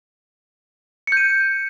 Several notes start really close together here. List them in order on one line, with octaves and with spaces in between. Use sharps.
C#7 G6 D#7